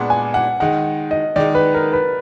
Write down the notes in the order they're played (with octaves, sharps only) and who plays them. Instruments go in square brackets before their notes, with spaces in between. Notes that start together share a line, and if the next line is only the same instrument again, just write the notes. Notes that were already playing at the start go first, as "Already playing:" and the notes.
Already playing: [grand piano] A#2 G#3 B3 D4 [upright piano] F#5
[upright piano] G#5
F#5
[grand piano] D#3 G#3 D#4 [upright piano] F#5
[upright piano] D#5
[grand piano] D#3 G#3 D#4 [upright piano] D5
[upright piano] B4
A#4
B4